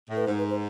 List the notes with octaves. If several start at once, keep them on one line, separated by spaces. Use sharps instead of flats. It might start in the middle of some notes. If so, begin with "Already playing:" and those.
A2
B4
G#2 C5
B4
C5